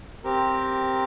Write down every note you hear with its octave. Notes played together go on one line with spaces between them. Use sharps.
C4 G4 A#4